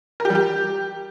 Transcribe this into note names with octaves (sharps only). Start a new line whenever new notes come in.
A#4
G4
G3
G4